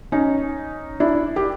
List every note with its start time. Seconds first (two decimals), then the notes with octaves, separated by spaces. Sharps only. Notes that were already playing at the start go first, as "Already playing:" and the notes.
0.12 C#4 D#4
1.00 D4 E4
1.36 G4